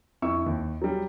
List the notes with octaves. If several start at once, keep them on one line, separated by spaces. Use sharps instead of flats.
F2 E4 C#6 E6
D#2
F#3 G3